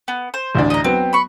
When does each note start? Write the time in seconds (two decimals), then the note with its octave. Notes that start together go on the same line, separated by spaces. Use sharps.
0.08 B3
0.34 C5
0.55 A1 D2 D4
0.70 D#5 A#5
0.84 F#3 B3 C4
1.13 B5 C#6